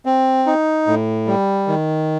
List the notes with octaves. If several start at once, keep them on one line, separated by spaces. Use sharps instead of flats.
C4
D#4
A2
G3
D#3